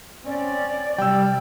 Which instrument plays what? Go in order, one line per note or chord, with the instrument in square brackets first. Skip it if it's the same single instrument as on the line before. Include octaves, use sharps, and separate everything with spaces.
[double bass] C4 C#4 [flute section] D5
[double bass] C3 [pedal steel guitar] G3 [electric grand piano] G5 E6